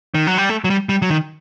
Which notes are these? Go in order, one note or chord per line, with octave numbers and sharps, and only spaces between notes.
D#3
F#3
G3
A3
F#3
G3
G3
F#3
D#3